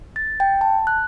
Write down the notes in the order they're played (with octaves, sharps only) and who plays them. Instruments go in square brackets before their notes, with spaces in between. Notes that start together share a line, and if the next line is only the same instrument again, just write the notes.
[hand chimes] A6
G5
A5
F#6